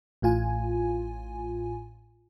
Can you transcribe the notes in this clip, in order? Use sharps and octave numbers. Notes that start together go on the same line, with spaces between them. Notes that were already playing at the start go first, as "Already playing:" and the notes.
A1 A2 F4 G#5